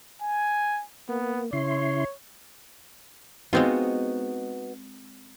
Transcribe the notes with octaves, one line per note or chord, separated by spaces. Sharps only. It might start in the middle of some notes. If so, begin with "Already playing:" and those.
G#5
A#3 B3
C#3 E4 C#5 C6
G#3 B3 C4 D#4 F4 F#4